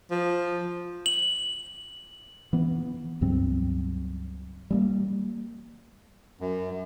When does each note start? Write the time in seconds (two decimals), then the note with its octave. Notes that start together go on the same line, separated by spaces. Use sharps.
0.11 F3
1.06 F#7
2.53 E3 B3
3.21 C#2 G2 F#3 C4
4.70 G3 G#3 A#3
6.41 F#2